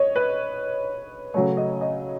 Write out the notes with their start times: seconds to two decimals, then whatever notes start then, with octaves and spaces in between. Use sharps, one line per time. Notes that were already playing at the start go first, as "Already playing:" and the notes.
Already playing: C#5 D#5
0.16 B4
1.34 C#3 F#3 A3 C#5
1.57 D#5
1.81 D#5